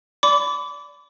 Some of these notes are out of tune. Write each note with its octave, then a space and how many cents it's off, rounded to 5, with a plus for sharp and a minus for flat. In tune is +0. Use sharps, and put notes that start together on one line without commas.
D5 -20 B5 +25 D6 -25